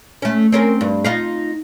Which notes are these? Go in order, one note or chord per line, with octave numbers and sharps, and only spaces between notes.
A3 C#4
C4 C#4 A#4
G2
D#4 F4 F5